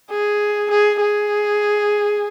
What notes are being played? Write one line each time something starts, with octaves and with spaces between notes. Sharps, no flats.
G#4
G#4
G#4